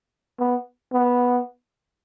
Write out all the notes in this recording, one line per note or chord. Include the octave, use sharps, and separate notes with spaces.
B3
B3